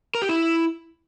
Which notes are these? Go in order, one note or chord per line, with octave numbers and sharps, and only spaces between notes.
A#4
G4
E4